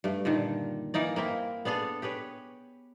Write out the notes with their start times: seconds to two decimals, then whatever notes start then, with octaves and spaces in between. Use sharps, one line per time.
0.04 G2 A3
0.25 A#2 D3 D#3
0.94 E3 A#3 D#4 D5
1.16 A#3 C4 E4
1.65 B3 D4 G#4 A4
2.02 G4 G#4 B4 C#5